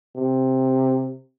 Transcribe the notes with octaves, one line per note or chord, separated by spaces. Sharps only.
C3